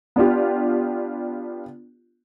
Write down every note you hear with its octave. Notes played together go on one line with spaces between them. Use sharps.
B3 D4 F4 G4